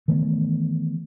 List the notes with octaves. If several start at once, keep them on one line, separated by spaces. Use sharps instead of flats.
D#3 E3 A3 B3